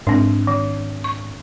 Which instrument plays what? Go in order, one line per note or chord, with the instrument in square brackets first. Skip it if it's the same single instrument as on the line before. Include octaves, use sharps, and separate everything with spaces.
[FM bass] G#2 [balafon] C4 D4
[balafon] D#3
C#6